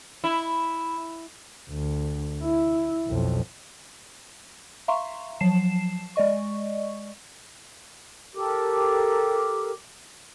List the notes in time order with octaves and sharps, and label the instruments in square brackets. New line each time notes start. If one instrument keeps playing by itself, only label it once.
[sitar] E4
[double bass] D2
E4
B1 F2
[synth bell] E5 F5 A#5 C6 C#6
F3 F#3 A5 C7 E7
G#3 D5 D#5 C#6
[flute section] G4 A4 A#4 D6